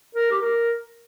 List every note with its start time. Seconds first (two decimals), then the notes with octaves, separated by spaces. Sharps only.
0.15 A#4
0.31 G4
0.42 A#4